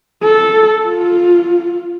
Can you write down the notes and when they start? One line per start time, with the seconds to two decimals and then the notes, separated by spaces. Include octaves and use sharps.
0.24 A4
0.85 F4